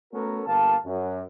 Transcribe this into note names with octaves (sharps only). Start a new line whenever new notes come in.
A3 B3 C#4 F#4 A4 A#4
G1 A#3 F5 A5
F#2